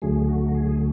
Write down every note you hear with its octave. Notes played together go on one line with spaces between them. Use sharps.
D2 D3 F#3 A3 G#4
F#4
G#4